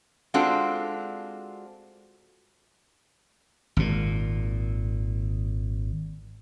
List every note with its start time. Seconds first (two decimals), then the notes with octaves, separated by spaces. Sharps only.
0.34 G#3 C4 D4 F4 F#4 A4
3.77 G#1 A#2